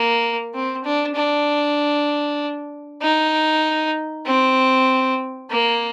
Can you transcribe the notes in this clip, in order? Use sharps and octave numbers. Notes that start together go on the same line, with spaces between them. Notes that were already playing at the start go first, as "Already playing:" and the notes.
Already playing: A#3
C4
D4
D4
D#4
C4
A#3